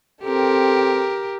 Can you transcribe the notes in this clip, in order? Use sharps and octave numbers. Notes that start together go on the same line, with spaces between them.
C4 G4 A4 A#4